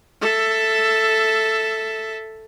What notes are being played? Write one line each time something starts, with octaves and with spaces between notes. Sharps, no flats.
A4 E5